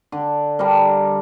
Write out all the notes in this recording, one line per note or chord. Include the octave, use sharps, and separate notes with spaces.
D3
G3 D4 A#4